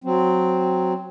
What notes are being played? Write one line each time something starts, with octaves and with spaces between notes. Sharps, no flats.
F#3 C4